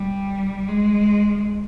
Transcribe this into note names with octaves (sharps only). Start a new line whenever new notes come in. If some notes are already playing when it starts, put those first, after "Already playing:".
Already playing: G3
G#3